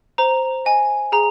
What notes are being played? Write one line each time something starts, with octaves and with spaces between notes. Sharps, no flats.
C5 A#5
D#5 G#5
G#4 A#5